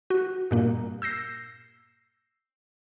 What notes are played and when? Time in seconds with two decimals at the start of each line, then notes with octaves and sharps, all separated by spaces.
0.10 F#4
0.51 G2 A#2 A#3
1.02 E6 G6 A#6 C7